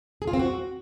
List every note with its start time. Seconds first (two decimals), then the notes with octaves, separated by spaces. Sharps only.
0.22 G#4
0.28 F4
0.33 C4
0.39 F#4